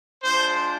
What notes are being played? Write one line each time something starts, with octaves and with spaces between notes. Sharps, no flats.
G#3 D4 F4 C5